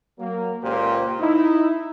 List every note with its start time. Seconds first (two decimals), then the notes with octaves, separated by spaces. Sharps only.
0.19 F#3 A#3
0.62 C#2 A#2 F4 G4 A#4 C5
1.20 D#4 E4